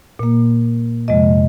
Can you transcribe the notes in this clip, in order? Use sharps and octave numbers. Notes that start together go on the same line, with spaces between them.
A#2 A#3
F2 C3 F3 G#3 D#5